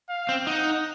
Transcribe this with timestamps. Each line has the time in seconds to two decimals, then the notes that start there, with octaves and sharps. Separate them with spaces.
0.09 F5
0.29 C4
0.47 D#4 F#5